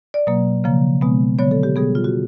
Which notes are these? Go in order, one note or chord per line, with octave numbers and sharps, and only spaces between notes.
D5
B2 F#3 A#3
C#3 F3 A#3
B2 G#3 B3
D3 F#3 B3 C#5
A4
G4
B2 G3 B3 G#4
F4
F#4